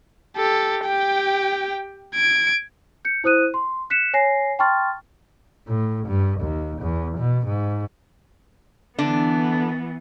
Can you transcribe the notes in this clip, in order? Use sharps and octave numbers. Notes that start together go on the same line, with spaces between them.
G4 A4
G4 G5
G#6 D7
G6 C#7
E4 C5 D#6 F#6 D#7
C6
F#6 B6 C#7 E7
C#5 G#5 A#6 C7
G5 A5 C6 C#6 F6 A6
A2
G2
D#2
E2
B2
G#2
D3 E3 B3 D4